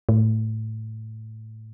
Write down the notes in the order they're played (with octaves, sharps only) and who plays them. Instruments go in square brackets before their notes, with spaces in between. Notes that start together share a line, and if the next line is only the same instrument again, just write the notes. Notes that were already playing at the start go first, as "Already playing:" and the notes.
[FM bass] A2